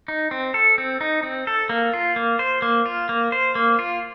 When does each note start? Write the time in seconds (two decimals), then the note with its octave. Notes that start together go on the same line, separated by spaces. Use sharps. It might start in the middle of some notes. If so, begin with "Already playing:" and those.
0.08 D#4
0.31 C4
0.54 A4
0.78 C4
1.01 D#4
1.23 C4
1.47 A4
1.69 A#3
1.93 F4
2.16 A#3
2.39 C5
2.62 A#3
2.86 F4
3.09 A#3
3.32 C5
3.55 A#3
3.79 F4